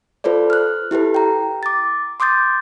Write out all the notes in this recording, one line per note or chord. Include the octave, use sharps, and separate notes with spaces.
F4 A4 B4 C5 D5
F6 F#6
E4 G4 A4 B4
G5 A#5
D6 A6
C6 D6 D#6 G6 A6